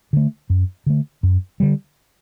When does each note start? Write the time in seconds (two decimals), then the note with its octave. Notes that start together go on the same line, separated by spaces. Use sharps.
0.13 D3 A3
0.50 F#2
0.86 D3 A3
1.23 F#2
1.60 D3 G3